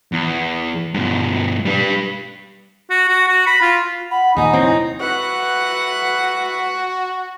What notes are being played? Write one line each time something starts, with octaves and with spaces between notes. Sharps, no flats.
E2
G2 B2
G3 B4
F#4
F#4
F#4
B5
F4
F#5 B5
D#2 A#2 D#4 G#5
F1 C4 E4 C#5
F#4 B4 E5 F#5